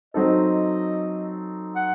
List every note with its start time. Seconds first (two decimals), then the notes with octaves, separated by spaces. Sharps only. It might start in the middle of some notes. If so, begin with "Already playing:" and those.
0.14 F#3 C4 D#4 A4 D#5
1.76 F#5